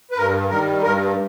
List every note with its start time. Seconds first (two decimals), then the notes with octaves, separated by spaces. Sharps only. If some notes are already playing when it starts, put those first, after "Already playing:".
0.11 B4
0.17 G2 A#4
0.50 D#3 G3 A#4
0.82 G2 A#4